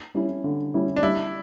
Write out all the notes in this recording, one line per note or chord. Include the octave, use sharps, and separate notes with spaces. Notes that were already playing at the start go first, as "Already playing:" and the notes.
G3 C#4 E4
D3
G3 C#4 E4
D4
G3 E4